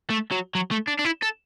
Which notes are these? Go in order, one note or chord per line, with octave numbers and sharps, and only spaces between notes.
A3
F#3
F#3
A3
D4
D4
E4
A4